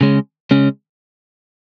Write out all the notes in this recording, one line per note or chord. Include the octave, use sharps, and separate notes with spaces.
C#3 G#3 C#4
C#3 G#3 C#4